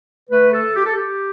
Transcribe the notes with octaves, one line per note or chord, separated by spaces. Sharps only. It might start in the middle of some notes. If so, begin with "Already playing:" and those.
D3 A3 B4
A4
G4
A4
G4